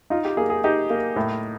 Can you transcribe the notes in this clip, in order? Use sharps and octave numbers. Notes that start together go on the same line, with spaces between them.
D#4 F4
G4
A#3 G#4
G#4
D#4 G4
A#3
A2